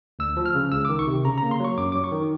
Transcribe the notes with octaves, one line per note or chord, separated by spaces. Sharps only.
D2 E6
F3
F6
C#3
C#2 E6
D6
D#3
C#6
C3
C#3 A#5
A#5
A#3
C6
F#3 C#6
F#2 D6
F#3 D6
C#6
D#3